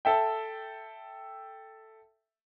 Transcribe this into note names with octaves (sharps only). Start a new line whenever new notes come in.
A4 E5 G5